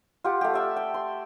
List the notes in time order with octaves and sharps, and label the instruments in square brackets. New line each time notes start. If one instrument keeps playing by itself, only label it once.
[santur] F4 G4 F#5
A3 G4
D5 E5 A5
G5
C6